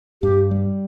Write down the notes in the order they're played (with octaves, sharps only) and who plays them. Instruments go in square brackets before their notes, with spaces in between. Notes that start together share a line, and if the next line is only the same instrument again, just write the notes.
[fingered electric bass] G2 [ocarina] G4
[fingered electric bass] G3